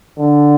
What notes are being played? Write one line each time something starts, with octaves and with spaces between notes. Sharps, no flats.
D3